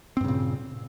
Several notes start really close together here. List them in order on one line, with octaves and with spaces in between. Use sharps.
C4 G2 C#3 A#2